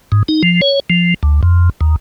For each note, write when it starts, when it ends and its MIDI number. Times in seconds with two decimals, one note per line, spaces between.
0.12 0.23 44
0.28 0.43 63
0.43 0.61 53
0.62 0.80 73
0.90 1.14 53
1.23 1.41 38
1.43 1.70 41
1.81 1.96 39